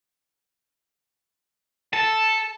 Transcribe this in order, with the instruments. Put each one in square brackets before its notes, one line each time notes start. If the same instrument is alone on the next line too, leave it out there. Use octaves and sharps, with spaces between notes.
[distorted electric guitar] A4 [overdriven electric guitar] A5